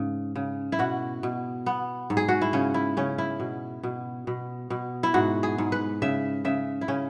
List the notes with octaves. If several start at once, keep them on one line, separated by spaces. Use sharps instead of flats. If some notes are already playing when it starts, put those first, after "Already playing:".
Already playing: G#2 C#3
C#3
E4
B2 F#4
B2
B3
G#2
G#4
F#4
E4
C#3 C#4
E4
C#3 C#4
E4
B2
B2
B2
B2
E4
G#2 F#4
G#4
G#2
B4
C#3 E5
C#3 E5
E4
C#3 C#4